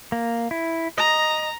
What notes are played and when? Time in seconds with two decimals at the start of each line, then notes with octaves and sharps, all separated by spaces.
0.12 A#3
0.51 E4
0.98 D#5 A#5